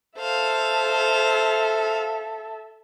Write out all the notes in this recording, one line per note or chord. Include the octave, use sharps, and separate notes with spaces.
A4 C5 E5 F5